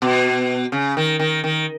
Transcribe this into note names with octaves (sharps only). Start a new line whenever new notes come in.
B2
C#3
D#3
D#3
D#3